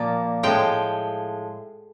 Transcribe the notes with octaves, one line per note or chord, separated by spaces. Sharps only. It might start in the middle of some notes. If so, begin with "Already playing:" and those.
Already playing: A#2 F3 A#3 D5
A2 F3 G#3 G5